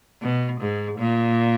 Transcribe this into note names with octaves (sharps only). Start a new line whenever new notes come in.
B2
G#2
A#2